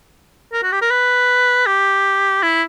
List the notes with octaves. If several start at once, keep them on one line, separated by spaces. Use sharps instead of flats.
A#4
F#4
G4
A#4
B4
G4
E4